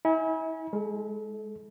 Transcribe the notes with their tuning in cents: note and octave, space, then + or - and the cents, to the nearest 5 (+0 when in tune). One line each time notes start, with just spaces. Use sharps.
E4 -40 G#5 +0
G#3 +0 A4 -30